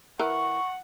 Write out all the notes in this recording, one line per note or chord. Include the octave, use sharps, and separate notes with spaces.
E3 A#4 F#5 C#6